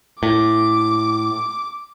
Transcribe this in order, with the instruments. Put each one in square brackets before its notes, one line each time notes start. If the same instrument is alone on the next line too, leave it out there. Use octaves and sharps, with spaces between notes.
[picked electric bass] A2 [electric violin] D6